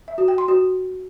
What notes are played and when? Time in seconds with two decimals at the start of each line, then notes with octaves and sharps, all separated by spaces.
0.08 E5
0.18 F#4
0.28 G5
0.38 C6
0.48 F#4